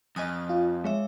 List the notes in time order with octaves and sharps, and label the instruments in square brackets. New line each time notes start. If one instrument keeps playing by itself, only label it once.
[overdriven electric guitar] F2 [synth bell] D#5 G#5 D#6
[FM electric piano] F4
[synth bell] G#3 C#5 E5